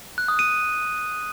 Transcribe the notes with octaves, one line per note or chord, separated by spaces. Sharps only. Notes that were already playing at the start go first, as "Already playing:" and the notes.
F#6
D#6
D#7